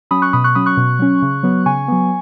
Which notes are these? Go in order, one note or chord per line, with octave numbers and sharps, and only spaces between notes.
F#3 C#4 B5 D#6
C#6 F#6
B2 B5 D#6
C#6 F#6
F#3 C#4 B5 D#6
C#6 F#6
B2
F#3 C#4
C#3
F#3 B3
C#3 G#5 C#6
F#3 B3